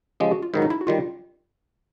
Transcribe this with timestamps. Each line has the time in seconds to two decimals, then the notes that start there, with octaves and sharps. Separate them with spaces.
0.20 C#3 F3 G#3 G4
0.31 F#4
0.42 F4
0.54 G#2 D#3 F#3 E4
0.62 D#4
0.70 E4
0.81 F#4
0.87 D#3 G3 F4